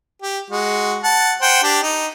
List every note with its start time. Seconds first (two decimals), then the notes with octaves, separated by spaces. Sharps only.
0.22 G4
0.50 G#3 F#4
1.03 F#5 A5
1.42 C5 F#5 G5
1.63 D4 G4
1.83 D#4